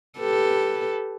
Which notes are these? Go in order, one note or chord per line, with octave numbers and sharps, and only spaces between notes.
G4 A4 B4